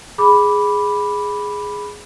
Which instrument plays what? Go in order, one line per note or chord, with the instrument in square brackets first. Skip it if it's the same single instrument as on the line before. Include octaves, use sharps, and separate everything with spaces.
[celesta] G#4 B5 D6